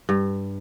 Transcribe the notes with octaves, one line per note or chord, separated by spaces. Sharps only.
G2